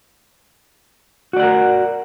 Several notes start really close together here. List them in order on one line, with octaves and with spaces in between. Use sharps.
F#4 D5 F#5 A#4